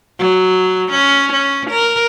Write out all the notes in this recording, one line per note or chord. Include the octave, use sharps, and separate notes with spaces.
F#3
C#4
C#4
A#4